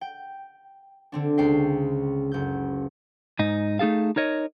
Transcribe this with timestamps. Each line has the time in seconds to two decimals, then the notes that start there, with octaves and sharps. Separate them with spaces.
0.01 G5
1.12 D3 C4 D4
1.38 C#2 C#3 C5 G5 C7
2.32 F#1 G6
3.39 G#2 D#4
3.79 A3 D#4 G#4 A4 F5
4.16 D#4 A#4 C#5 D#5